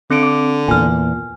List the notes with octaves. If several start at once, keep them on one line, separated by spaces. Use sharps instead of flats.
D3 C4 C#7 D7
D6
E2 A#2 G#5 F6